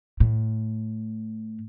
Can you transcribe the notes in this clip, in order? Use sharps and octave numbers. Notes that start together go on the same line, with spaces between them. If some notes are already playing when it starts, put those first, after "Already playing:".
A2